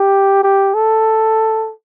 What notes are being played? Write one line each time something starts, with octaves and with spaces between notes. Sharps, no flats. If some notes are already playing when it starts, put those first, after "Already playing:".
Already playing: G4
G4
A4